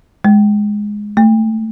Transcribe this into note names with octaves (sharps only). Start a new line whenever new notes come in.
G#3
A3